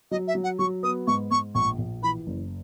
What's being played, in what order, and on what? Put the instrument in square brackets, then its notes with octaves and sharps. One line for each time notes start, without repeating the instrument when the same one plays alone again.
[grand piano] F#3 [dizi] D#5
[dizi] E5
[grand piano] F#3
[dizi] F#5
[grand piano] F#3 [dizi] C#6
[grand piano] B3 [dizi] D#6
[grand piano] G#2 [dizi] C#6
[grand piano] G#2 [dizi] C#6
[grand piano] A#1 [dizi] C#6
[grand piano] A#1
[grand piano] E3 [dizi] B5
[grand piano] F#1